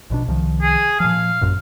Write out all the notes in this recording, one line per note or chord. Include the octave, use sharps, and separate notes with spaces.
A#1 B2 D4
C2 D#3 F3
G#4
A#2 F3 F5
A1 F#2 A#2